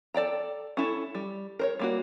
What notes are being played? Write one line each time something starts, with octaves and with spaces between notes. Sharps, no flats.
A4 D5 G5 A#5
C#4 E4 A4
G3
A#4 C5 C#5
G3 A#3 F#4